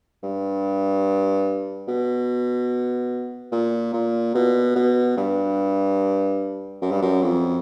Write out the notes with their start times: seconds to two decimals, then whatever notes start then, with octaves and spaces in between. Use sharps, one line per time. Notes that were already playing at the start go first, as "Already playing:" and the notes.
0.23 G2
1.88 B2
3.52 A#2
3.93 A#2
4.34 B2
4.75 B2
5.17 G2
6.82 F#2
6.91 G2
7.02 F#2
7.22 F2